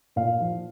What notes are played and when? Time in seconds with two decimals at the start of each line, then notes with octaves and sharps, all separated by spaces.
0.16 A#2 F5
0.40 F3